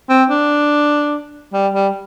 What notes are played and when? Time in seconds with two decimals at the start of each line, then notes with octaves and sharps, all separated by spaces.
0.09 C4
0.30 D4
1.53 G3
1.74 G3